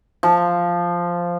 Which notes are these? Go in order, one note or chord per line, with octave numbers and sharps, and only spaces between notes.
F3